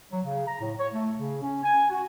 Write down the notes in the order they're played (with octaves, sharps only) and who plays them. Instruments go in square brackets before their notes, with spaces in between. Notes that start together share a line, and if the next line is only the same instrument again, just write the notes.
[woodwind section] F#3
C#3
A#5
A2
C#5
A3
C#3
C#4
G#5
F#4